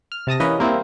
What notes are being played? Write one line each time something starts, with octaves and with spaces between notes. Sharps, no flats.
F6
C3 A5 D#6 A#6
E3 A#3 C#4 B4 C#5 D#5
G3 A#3 C4 E4